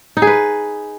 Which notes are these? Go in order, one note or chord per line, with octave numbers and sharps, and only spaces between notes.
D#4
G#4
B4